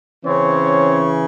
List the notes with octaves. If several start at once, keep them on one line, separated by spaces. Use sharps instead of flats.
C#3 E3 C4 C#4 C#5